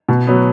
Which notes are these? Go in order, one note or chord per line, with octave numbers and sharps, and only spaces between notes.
B2
F#3 B3